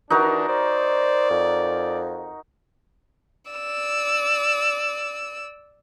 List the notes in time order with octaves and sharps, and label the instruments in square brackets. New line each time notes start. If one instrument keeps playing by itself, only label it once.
[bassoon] E3 [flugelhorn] D4 [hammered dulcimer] D#4 F#4 A#4
[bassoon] C5 [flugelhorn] D5
[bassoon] F2
[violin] D5 E6